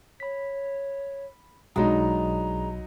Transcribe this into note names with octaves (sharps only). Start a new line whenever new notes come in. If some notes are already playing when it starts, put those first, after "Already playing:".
C#5 B5 B6
B1 F#3 G#3 D4 D#4 A#5 B5 D#6